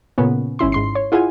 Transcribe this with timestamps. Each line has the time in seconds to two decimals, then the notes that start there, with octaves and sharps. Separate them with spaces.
0.18 A#2 C#3 B3 C#4
0.59 G#1 C#4 E4 C6
0.72 G#2 C6 C7
0.95 C#5
1.12 E4 F4 G#4 F#5 G#5